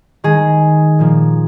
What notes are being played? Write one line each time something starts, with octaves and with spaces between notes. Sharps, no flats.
D#3 G#3 D#4 G#4
A#2 F3 A#3